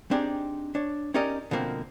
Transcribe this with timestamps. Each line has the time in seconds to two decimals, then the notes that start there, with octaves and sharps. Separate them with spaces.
0.11 C4 D4 D#4 G4 G#4
0.75 D4 C#5
1.14 C#4 D#4 G4 A#4 D5 D#5
1.51 B2 D3 F3 A#3 C4